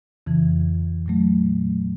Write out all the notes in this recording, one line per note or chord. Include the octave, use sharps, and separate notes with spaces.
F2 C#3 E3
A#2 F#3 A3